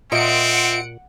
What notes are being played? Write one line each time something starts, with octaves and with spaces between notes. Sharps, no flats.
A#2 C4 F4 D#5 E5 F#5 C#7 D7